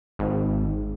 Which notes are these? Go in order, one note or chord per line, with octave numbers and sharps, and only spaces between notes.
G#1